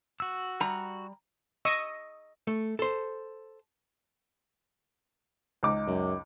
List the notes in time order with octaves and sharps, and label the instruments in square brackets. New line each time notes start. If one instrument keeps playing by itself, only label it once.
[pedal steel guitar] F#4 E6
[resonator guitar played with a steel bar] G3 A#5
[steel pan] D#5 C#6 D#6 E6
[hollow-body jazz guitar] A3
A4 C5
[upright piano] C#2 D#4 D6
[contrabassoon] F#2